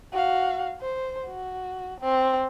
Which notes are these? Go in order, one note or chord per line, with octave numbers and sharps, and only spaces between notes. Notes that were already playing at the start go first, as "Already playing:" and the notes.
F#4 F5
C5
F#4
C4